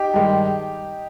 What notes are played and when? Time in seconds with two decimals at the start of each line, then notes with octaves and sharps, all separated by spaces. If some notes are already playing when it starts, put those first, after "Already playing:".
Already playing: D#4 G4
0.14 G2 D#3 G#3